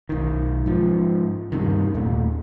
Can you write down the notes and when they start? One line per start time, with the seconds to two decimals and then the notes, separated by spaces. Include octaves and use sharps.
0.09 B1 D#3
0.66 G#2 F3
1.52 G2 C3 D#3
1.94 D#2 A#2 A3